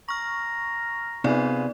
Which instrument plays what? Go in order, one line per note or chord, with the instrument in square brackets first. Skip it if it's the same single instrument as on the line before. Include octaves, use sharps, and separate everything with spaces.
[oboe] A#5 [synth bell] C#6 F6
[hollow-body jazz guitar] C3 [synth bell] B3 D#4 D5 [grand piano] F4 G#4 B4